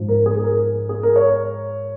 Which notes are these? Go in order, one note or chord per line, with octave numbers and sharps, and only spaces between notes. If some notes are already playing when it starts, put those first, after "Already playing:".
Already playing: G#2 F3
A#4
G#4
G#4
A#4
G#4
A#4
C#5